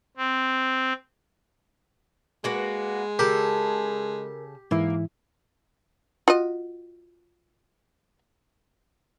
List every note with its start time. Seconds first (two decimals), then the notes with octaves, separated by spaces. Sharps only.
0.17 C4
2.44 G#3 A#3 F#4 B4
3.19 C#3 G4 A4 A#4
4.71 G#2 E3 A#3 E4
6.28 F4 F#4 D#5